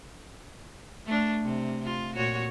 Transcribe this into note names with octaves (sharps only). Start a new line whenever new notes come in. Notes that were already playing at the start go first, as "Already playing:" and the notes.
A3 D4
C3
F4
A#2 F#4 C#5